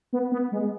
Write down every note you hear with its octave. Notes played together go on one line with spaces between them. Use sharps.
B3
B3
G#3